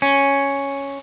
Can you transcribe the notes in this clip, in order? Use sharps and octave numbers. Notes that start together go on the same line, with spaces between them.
C#4